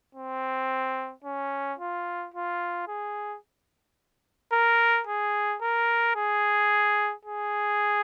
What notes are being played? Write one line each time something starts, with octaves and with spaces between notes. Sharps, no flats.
C4
C#4
F4
F4
G#4
A#4
G#4
A#4
G#4
G#4